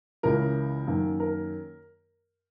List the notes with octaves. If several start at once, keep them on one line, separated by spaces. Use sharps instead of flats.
C#2 C#3 E3 A#4
F#2 D#3 A#3
A#4